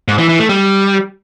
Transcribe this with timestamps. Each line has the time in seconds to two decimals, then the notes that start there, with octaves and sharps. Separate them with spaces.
0.08 G#2
0.19 E3
0.29 E3
0.39 A3
0.49 G3